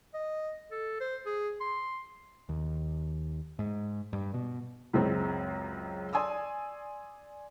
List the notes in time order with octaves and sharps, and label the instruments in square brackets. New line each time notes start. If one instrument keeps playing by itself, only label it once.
[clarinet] D#5
A4
C5
G#4
C6
[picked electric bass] D#2
G#2
G2
B2
[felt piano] C#2 F#2 G#3 C4
D5 G#5 C6 D#6 E6